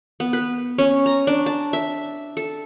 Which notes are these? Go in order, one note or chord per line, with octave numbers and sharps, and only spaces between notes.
B3
B4
C#4
A#5
D4
A5
E5
A4